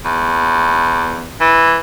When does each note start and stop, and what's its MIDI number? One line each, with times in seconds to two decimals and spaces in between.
0.05 1.31 40
1.41 1.80 52